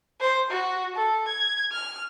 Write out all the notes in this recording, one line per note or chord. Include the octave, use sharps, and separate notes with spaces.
C5
F#4
A4
G#6
F6